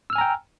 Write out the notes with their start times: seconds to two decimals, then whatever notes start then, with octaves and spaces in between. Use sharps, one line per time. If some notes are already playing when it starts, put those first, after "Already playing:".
0.10 E6
0.13 F6
0.15 G#5
0.18 A#5
0.21 G5